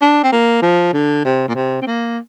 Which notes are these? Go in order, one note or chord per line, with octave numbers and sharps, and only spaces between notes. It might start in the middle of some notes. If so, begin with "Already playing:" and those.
D4
C4
A#3
F3
D3
C3
A#2
C3
C4
A#3